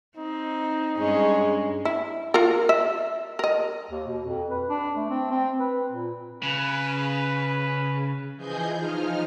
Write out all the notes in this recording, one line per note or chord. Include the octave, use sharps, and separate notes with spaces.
C4 D#4
G2 G#3 C#4 G#4
E4
F4 A#4
E5
A#4 D#5
D#2
B2
F2
B4
D4
A3
C4
C4
B4
A#2
C#3 B4
E3 F3 G#4 D#5 G#5 G6
F3 D#4 F6